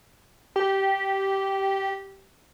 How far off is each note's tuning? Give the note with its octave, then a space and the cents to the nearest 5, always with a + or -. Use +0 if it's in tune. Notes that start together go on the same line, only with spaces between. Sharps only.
G4 -10